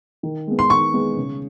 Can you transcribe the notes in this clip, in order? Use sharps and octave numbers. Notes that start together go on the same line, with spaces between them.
D#3
G#3 B3
C6
D#3 C#6
G#3 B3
C#3